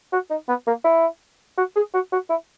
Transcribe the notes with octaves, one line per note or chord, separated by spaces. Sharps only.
F#4
D#4
B3
A#3
E4
F#4
G#4
F#4
F#4
E4